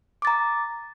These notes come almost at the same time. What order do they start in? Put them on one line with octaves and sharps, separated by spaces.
D6 A6 A#5